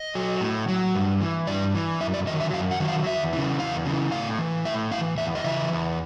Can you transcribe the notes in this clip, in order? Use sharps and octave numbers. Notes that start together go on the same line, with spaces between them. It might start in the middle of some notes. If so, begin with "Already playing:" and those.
Already playing: D#5
F#3
A2
F#3
G2
E3
G2 D5
E3
F#2 E5
D5
D#3 F#3 D#5
E5
F#2 F5
F#5
D#3 F#3
F5
E2 E5
C#3 E3
E2 F5
C#3 E3
A2 F5
E3
A2 E5
E3 F5
E2 E5
D#5
C#3 E3 E5
E2